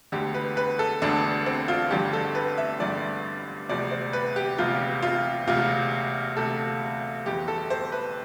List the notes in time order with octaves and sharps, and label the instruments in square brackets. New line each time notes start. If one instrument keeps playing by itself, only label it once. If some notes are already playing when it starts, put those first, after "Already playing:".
[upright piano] E1 D2 D3 G4
B4
B4
A4
E1 D2 D3 D4
C4
F4
A1 G2 D3 F3 G4
A4
B4
E5
A1 G2 D3 F3 D5
E1 D2 C3 F3 D5
C5
B4
G4
E1 D2 C3 F3 F4
F4
E1 D2 C3 F4
E1 D2 C3 A4
G1 F2 E3 G4
A4
C5
B4